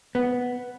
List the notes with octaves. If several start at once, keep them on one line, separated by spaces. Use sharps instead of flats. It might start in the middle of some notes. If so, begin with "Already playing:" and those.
B3